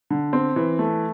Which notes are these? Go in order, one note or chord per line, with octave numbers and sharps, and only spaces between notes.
D3
C4
E3
A3